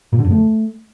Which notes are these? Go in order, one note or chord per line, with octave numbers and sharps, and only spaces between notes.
A#2
D3
F2
A3